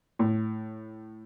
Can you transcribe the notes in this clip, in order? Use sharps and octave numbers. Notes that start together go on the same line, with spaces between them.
A2